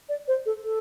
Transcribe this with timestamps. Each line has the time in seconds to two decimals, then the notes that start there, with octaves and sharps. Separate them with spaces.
0.09 D5
0.28 C5
0.46 A4
0.64 A4